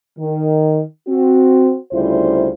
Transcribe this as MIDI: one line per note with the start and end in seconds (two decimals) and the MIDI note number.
0.18 0.81 51
1.08 1.76 60
1.08 1.76 66
1.92 2.48 38
1.92 2.48 49
1.92 2.48 55
1.92 2.48 64
1.92 2.48 65
1.92 2.48 72